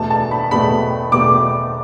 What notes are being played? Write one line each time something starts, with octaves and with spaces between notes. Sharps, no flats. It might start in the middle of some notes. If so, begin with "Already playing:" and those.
Already playing: E2 B2 A3 A5
A5
B5
E2 B2 A3 B5
E2 B2 A3 D6